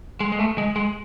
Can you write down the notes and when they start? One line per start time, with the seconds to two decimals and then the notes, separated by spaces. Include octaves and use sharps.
0.20 G#3
0.32 G#3
0.39 A3
0.58 G#3
0.76 G#3